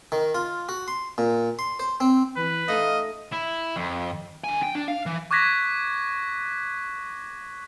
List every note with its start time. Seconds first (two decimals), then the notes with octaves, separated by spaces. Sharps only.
0.12 D#3
0.35 F4
0.69 F#4
0.88 C6
1.18 A#2
1.59 C6
1.80 C5
2.00 C4
2.36 E3 B4
2.68 A3 D#4 D#5 F5
3.33 E4
3.76 F2
4.44 D3 G#5
4.63 G5
4.75 D4
4.88 F5
5.06 E3
5.31 C#6 D6 F#6 G#6 A#6 B6